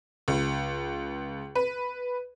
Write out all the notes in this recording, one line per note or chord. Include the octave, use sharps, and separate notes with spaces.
C#2
B4